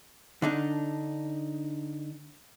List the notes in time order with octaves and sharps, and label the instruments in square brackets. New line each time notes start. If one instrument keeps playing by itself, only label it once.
[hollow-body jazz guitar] D3 D4 D#4